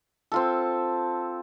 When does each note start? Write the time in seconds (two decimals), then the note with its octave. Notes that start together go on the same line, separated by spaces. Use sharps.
0.32 C4 F4 A4